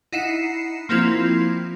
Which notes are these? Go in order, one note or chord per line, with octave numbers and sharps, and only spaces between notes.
D#4 E4 F#5 C7 C#7 E7
F3 A#3 C4 E4 F4 G#6